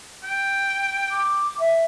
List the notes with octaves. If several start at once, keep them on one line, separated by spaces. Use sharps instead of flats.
G5
D6
E5